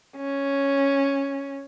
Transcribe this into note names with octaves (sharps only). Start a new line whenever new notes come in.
C#4